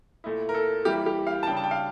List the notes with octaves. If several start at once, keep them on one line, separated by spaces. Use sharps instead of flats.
A#2 A3 E4
A#4
A4
E3 G3 A#3 E4 G4
G4
F5
A5
C#3 G3 D4 G5
A5
G5
F5